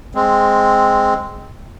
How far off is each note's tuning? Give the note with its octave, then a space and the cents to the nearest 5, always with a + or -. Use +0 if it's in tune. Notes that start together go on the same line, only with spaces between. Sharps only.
G#3 +0 C4 +0